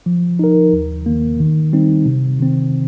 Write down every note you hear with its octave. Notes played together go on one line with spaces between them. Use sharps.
F3
D#4 A#4
D#2
D#3 A#3
D#3
G3 C4 D#4
C3
D#3 C4